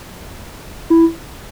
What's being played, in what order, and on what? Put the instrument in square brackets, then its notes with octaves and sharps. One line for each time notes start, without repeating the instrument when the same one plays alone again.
[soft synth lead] E4